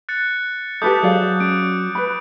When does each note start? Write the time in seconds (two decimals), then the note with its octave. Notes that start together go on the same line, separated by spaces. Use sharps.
0.09 F#6 A6 C#7
0.82 G4 A4 B4 E5 D6 D#6 G6
1.03 F#3 G#4 D5 F5
1.40 C#4 D7
1.95 B4 B5